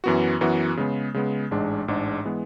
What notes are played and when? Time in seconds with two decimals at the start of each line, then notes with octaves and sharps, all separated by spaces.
0.04 F#2 E3 B3 F#4
0.41 F#2 E3 B3 F#4
0.77 C#3 G#3 B3
1.14 C#3 G#3 B3
1.51 A1 G#2 G#3 D4
1.88 A1 G#2 G#3 D4
2.25 E3 G#3 B3